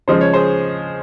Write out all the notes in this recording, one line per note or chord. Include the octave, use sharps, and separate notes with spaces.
C#3 F3 G#3 C5
C#5
G#4 C5